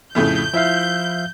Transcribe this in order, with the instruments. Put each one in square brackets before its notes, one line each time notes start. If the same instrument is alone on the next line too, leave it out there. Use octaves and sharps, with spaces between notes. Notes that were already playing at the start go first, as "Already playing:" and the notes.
[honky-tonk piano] F2 A2 C#3 [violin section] G6
[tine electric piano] F3 E5 F5 [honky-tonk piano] E4